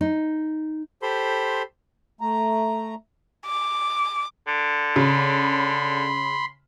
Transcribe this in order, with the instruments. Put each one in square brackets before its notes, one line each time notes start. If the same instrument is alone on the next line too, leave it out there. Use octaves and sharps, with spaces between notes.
[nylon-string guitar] D#4
[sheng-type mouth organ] G4 A4 C5 B5 C6
[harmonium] A3 A#5
[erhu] D6
[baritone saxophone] D3
[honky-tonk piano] C#3 [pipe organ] B5 C6